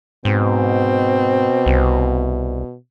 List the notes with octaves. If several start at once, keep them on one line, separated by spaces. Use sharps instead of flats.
G#2 B2 C4
C2